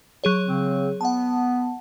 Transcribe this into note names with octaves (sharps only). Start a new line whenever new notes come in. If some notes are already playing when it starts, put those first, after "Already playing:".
F#3 G#4 C#5
C#3 C4
B3 F#5 A5